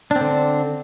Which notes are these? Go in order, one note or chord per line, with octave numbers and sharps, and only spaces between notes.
D3 C4 D4